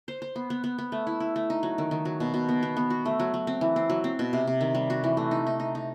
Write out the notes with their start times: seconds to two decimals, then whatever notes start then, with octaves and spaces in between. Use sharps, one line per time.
0.08 C5
0.22 C5
0.35 B3
0.50 B3
0.64 B3
0.78 B3
0.92 A3
1.07 E4
1.20 E4
1.36 A3
1.50 D#4
1.63 F#3
1.78 D#3
1.91 D#3
2.05 F#3
2.20 B2
2.34 B2
2.49 B3
2.63 B3
2.77 B3
2.90 F#4
3.05 A3
3.20 F#3
3.34 F#3
3.47 C4
3.61 E3
3.76 C4
3.90 F#3
4.04 C4
4.19 B2
4.33 C3
4.47 C3
4.61 D#3
4.75 G3
4.90 F#4
5.04 E3
5.17 A3
5.31 D#4
5.46 D#4
5.60 D#4
5.75 D#4